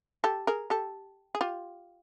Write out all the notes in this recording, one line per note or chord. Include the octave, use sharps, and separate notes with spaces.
G4 A4
G#4 A#4
G4 A4
G#4
F4 G4